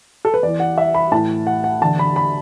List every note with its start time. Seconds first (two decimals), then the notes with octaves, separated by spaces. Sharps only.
0.25 A4
0.34 B4
0.43 E2 E3 D5
0.60 F#5
0.78 E5
0.94 B5
1.12 A2 E3 A5
1.47 F#5
1.64 F#5
1.81 E2 D3 A5
1.99 B5
2.16 B5